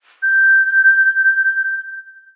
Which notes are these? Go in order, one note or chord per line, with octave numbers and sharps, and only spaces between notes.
G6